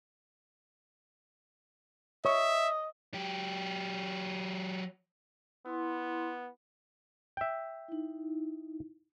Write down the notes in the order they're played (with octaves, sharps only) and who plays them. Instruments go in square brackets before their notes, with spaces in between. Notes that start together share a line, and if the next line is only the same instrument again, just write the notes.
[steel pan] C#5 C#6 [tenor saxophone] D#5 [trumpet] E5
[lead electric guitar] F#3 G4
[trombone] B3 [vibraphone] E4 C6
[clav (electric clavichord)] E5 G5
[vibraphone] D#4 E4